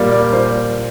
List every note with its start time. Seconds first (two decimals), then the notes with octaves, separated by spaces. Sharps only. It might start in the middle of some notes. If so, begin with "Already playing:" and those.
Already playing: A#2 G3 A#3 D5
0.11 D5
0.33 A#2 C5